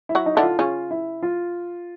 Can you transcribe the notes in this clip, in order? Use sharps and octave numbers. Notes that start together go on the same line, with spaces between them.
E4
F#3 F#4
D#4
D3 D4 E4
F4
C#3 C#4 F4
E4
F4